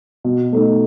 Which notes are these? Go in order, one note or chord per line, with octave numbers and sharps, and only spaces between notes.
B2
A3 D#4 A4